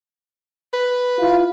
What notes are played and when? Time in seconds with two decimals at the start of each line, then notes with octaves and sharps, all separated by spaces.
0.73 B4
1.18 E4 F4